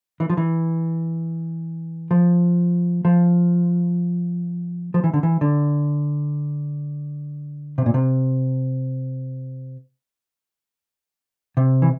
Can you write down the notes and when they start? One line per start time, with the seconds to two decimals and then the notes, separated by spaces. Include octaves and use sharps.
0.20 E3
0.30 F3
0.37 E3
2.11 F3
3.05 F3
4.94 F3
5.04 E3
5.14 D3
5.23 E3
5.41 D3
7.78 C3
7.86 A#2
7.94 C3
11.57 C3
11.82 E3